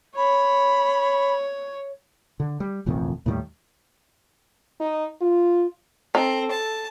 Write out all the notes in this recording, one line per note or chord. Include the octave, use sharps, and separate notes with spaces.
C#5 B5
D3
G3
E1 A1 F2 D#3
D#2 A2 D#3 G3
D#4
F4
C4 D#4 A4
A5